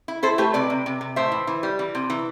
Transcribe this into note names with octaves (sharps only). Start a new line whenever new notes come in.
E4
E4 A4 C5
A3 G4 B4
C3 B4 D5
C3
C3
C3
A2 C5 E5
E3
E3
G3
E3
C3
E3